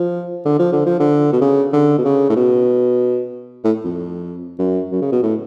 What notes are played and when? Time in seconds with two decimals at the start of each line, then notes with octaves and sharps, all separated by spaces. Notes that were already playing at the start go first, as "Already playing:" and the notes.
Already playing: F3
0.45 D3
0.59 F3
0.72 D3
0.86 F3
1.00 D3
1.33 B2
1.41 C#3
1.73 D3
1.98 B2
2.05 C#3
2.29 A2
2.36 B2
3.64 A2
3.85 F2
4.59 F#2
4.92 F#2
5.02 C#3
5.12 B2
5.23 A2